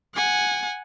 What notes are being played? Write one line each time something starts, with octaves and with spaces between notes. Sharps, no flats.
F#5 G#5